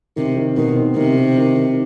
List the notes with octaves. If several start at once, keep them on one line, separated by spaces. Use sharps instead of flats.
C3 D#3
D#3
B2 D#3
C4
C3 D#3
D#3
D#3
D#3